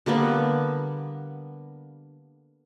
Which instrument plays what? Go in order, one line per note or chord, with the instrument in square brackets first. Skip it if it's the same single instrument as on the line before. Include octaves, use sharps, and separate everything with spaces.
[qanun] D3 G3 A#3 B3